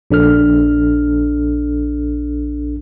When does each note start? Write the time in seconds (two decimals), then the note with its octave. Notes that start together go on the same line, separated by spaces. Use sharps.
0.11 A#1 D4 A4 F6